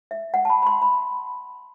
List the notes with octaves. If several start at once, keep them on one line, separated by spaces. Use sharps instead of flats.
E5
F#5
A5
B5
B5
C6
B5